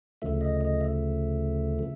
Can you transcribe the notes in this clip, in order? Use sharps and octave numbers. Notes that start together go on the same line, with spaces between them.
D2 C#3 F3 A3 E5
D#5
D#5
E5
C#3